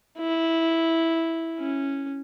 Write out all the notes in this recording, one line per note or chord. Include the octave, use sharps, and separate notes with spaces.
E4
C#4